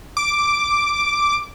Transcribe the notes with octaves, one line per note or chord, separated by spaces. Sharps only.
D6